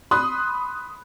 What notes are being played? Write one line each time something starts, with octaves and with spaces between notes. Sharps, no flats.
B5 C6 D#6 F#6